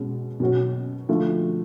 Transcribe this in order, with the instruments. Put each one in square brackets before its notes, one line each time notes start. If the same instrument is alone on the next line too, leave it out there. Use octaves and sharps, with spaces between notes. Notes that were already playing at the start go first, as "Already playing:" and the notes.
Already playing: [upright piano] B2 G#3 C#4 F#4
B2 F#3 C#4 F#4 C#5
D3 F3 A3 F4